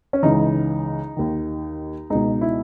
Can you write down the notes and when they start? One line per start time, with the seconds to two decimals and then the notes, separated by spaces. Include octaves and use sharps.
0.13 C#4
0.23 C#2 C#3 E3 D#4
1.17 D#2 D#3
2.10 C#2 B2 D#4
2.41 E4